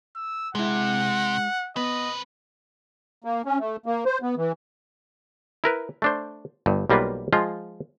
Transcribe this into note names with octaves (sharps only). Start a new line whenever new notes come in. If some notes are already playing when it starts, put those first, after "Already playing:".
E6
C3 G#3 E4 F#5
B3 C4 B4 D#5
A#3
C#4
A3
A#3
C5
B3
E3
E4 A#4 B4
A3 D4 C5
G1 G2
B1 G3 A#3 F4 B4
F3 G#3 F4